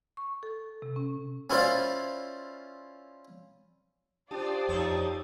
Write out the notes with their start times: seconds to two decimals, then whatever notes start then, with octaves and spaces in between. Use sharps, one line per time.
0.17 C#6
0.43 A4
0.82 C3
0.96 C#4
1.50 C#4 E4 F4 C5 D5 F5
4.31 D4 F4 G4 C5 D5 A5 D#6
4.69 F2 D#4 A4 C#5